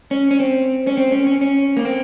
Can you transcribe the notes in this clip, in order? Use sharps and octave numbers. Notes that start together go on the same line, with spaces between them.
C#4
C#4
C4
C#4
C4
C#4
C#4
C#4
A#3
C4